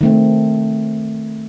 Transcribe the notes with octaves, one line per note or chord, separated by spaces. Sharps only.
D#3 A3 C4